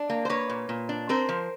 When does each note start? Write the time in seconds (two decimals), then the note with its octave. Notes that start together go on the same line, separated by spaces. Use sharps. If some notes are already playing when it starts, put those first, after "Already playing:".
Already playing: D4
0.10 A#3
0.25 C5
0.30 A#3 B4 C#5
0.49 A#2
0.69 A#2
0.89 D4
1.09 C4 A#4 C5
1.29 F3